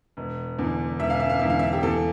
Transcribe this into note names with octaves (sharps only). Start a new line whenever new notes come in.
E1
E2 D3
E1 E5
F5
E5
F5
E2 D3 E5
F5
E5
G4
E2 A4